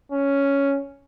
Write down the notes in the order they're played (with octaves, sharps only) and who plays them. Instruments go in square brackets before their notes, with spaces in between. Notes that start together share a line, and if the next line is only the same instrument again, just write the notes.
[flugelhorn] C#4